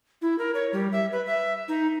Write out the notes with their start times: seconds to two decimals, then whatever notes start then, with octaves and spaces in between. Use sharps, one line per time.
0.22 E4
0.39 A#4
0.55 C#5
0.73 G3
0.92 E5
1.12 B4
1.26 E5
1.68 D#4